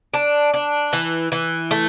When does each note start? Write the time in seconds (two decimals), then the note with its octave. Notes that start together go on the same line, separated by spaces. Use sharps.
0.14 D4
0.54 D4
0.93 E3
1.32 E3
1.71 A3